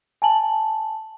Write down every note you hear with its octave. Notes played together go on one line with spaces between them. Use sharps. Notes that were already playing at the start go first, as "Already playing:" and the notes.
G#5 A5 F#7